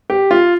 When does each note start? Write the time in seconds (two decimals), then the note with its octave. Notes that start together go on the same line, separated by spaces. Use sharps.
0.10 G4
0.31 F4